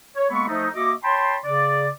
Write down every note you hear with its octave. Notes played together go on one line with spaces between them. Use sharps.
C#5
G#3 A#3 B3 A4 B5 C#6
F3 A3 D#4
A#3 F#4 D#5 E5 D6
C#5 G5 A5 B5 C6
C#3 D5